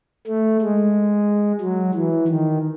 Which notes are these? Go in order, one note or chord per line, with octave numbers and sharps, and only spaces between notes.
A3
G#3
F#3
E3
D#3